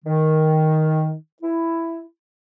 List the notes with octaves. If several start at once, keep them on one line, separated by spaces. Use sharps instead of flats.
D#3
E4